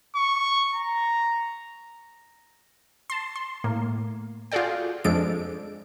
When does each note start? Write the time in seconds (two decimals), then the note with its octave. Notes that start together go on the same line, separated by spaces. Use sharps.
0.15 C#6
0.75 A#5
3.10 A5 C6
3.36 C6
3.64 A2 A#3
4.52 F4 F#4 G#4 A4 D5 G5
5.04 F2 F3 G#3 D4 A4 D7